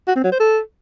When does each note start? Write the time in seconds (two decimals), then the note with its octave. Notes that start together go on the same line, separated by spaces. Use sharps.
0.07 F#4
0.16 C4
0.24 F#3
0.32 C5
0.40 A4